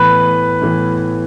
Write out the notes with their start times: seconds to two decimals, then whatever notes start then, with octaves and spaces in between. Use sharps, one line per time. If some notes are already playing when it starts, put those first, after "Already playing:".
Already playing: A2 E3 B3 B4
0.62 A2 E3 B3